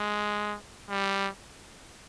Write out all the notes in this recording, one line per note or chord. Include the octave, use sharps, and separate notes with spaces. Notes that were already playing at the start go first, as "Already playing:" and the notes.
Already playing: G#3
G3